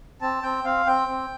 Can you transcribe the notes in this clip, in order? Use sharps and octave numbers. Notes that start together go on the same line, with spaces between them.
C4 A5
C4 G5
C4 F5
C4 G5
C4